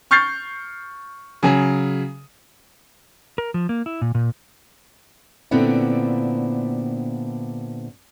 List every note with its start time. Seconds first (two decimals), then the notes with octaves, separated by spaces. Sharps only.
0.11 C#6 F6 G6 A6 C7
1.43 C#3 F#3 G#4
3.38 A#4
3.54 F3
3.69 A#3
3.86 E4
4.02 A#2
4.15 A#2
5.51 A#2 D3 B3 C4 D4 E4